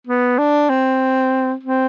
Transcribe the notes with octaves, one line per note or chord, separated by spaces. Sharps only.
B3
D4
C4
C4